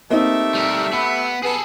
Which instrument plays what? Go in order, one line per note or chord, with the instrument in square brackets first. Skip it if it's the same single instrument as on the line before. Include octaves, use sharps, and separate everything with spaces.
[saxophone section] A3 G4 E5 [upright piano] A#3 C4 D#4
[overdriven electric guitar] G3 A#4
[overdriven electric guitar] B3 [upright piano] B5
[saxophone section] B3 [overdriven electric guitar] G#4 A4